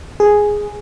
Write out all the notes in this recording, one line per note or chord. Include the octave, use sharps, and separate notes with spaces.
G#4